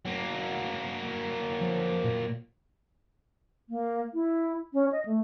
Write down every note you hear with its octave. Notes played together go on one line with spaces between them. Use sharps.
F#3 A#3
F3
A#2
A#3
E4
C#4
D#5
A3